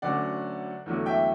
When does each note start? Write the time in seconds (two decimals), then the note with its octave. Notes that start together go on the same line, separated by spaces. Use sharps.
0.02 D2 D3 F#3 C#4 D5 F#5
0.86 E2 D3 F#3 A3
1.06 E5 G5